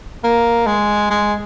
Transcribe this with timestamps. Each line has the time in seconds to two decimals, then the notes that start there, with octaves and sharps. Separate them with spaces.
0.24 A#3
0.66 G#3
1.10 G#3